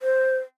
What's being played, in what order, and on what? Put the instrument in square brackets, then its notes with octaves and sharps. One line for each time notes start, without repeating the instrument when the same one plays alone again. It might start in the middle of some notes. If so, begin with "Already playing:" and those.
[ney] C5